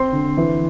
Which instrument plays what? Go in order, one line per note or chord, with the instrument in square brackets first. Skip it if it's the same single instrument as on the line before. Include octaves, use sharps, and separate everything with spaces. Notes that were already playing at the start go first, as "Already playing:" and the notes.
Already playing: [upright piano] C4 C6
D3
E3